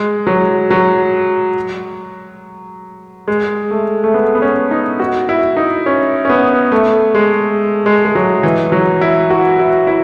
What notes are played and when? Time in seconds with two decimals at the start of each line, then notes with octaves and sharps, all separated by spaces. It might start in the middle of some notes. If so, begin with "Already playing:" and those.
Already playing: G#3
0.27 F#3
0.70 F#3
3.28 G#3
3.71 A3
4.04 A3
4.14 B3
4.35 B3
4.42 C#4
4.71 D#4
5.00 F#4
5.29 E4
5.57 D#4
5.86 C#4
6.25 C#4
6.29 B3
6.72 A3
7.15 G#3
7.86 G#3
8.05 G#3
8.15 F#3
8.43 E3
8.72 F#3
9.01 E4
9.30 F#4
9.59 E4
9.87 E4